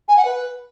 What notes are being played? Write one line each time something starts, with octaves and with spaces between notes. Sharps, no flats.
G#5
F#5
B4